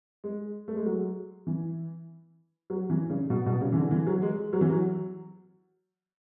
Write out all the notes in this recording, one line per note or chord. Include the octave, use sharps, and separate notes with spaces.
G#3
A3
G#3
F#3
E3
F#3
E3
C#3
B2
B2
C#3
E3
D3
E3
F#3
G#3
F#3
E3
F#3